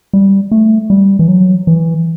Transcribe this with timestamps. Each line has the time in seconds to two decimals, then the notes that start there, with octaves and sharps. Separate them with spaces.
0.13 G3
0.52 A3
0.90 G3
1.19 E3
1.28 F#3
1.67 E3